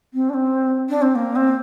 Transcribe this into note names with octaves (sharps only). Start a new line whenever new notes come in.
C4
D4
C4
D4
C4
A#3
C4